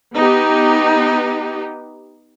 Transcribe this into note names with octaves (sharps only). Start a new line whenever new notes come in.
B3 D#4 G4